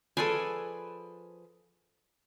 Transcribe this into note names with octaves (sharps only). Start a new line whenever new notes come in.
F3 G#4 A4 B4 D5 G#5